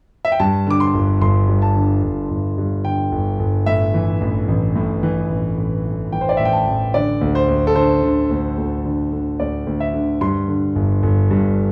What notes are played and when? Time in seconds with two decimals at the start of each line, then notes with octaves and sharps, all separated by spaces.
0.25 E5
0.32 G5
0.40 G2 A5
0.67 D3 D6
0.80 C6
0.94 G1
1.21 G1 C6
1.48 G2
1.62 A5
1.75 D3
2.03 G1
2.31 G1
2.58 G2
2.84 D3 G5
3.12 G1
3.39 G1
3.66 A2 E5
3.94 E3
4.21 A1
4.48 A1
4.76 A2
5.03 E3
5.30 A1
5.58 A1
5.85 A2
6.12 E3 G5
6.21 C5
6.29 D5
6.37 A1 E5
6.45 G5
6.53 A5
6.67 A1
6.94 D3 D5
7.21 D2
7.35 C5
7.48 D2
7.67 A4
7.75 D3 C5
8.03 D3
8.30 D2
8.58 D2
8.85 D3
9.12 D3
9.40 D2 D5
9.67 D2
9.80 E5
9.94 D3
10.21 G2 C6
10.48 D3
10.76 G1
11.03 G1
11.31 G2